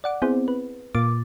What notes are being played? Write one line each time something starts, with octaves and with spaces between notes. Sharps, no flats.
D5 F#5 D6
B3 C4 E4 G#4 C5
B4
A#2 A#3 F4 D6 A6